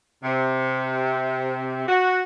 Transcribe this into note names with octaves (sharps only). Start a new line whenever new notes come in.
C3
F#4